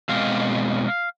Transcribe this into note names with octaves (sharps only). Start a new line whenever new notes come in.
B2 G#3 C4 F5